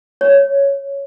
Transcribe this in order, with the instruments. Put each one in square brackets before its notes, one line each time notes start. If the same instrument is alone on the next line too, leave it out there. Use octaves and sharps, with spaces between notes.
[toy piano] C#5